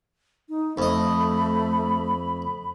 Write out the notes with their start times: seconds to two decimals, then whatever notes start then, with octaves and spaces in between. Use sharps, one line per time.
0.49 D#4
0.78 F2 A3 D#5 B5